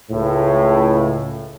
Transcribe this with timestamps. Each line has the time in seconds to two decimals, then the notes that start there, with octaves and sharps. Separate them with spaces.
0.11 C#2 A2